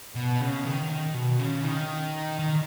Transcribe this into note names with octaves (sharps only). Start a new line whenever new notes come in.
B2
C#3
D#3
D#3
B2
C#3
D#3
D#3